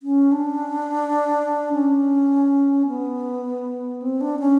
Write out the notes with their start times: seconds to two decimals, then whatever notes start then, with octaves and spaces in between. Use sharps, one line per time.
0.03 C#4
0.32 D4
1.73 C#4
2.87 B3
4.02 C4
4.21 D4
4.39 C#4